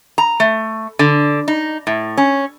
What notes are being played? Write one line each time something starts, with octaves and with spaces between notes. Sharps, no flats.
A#5
A3
D3
D#4
A2
C#4